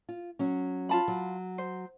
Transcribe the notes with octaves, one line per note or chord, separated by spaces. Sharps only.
F4
F#3 C#4
F4 A5 B5
F#3
C5